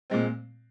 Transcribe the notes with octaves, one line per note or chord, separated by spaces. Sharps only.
A#2 G#3 C4